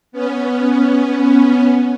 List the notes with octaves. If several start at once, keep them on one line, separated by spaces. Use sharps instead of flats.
B3 C#4